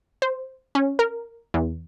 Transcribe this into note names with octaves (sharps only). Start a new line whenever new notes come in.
C5
C#4
A#4
E2